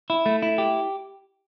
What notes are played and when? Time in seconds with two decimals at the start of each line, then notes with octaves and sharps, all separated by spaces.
0.10 E4
0.26 A3
0.42 E4
0.58 G4